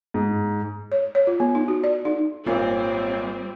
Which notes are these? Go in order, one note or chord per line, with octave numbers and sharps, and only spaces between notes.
G#2
C#5
C#5
F4
B3
D#4
F#4
D5
D#4
G#1 A#2 G3 C4 F4 C#5